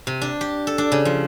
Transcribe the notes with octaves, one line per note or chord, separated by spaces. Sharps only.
C3
D4
G4
A4
D4
C#3
F3